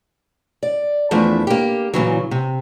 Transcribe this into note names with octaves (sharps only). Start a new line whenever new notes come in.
D5
E2 F3 A3 D4 E4
A#3 G4
A#2 C#3 E3 F#3
C3